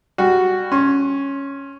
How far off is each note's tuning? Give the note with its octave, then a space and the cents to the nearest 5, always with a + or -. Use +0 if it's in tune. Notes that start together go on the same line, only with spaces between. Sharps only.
G3 +20 F#4 +0
C#4 +0 C6 +30